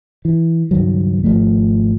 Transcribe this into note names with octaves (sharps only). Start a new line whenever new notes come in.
E3
C#2 G2 D#3 F#3
G#1 F3 A3